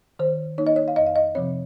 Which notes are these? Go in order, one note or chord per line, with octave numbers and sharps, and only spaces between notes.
D#3 C5
A#3 D#4 C#5
D#5
C#5
F5
F2 D#5
F5
D#5
C3 F3 C4 C#5